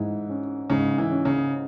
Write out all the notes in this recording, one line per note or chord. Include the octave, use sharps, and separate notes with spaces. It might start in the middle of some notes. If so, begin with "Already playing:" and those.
Already playing: G#2 E3 E4
C#4
G#2 C#3
E3
C#4
C#3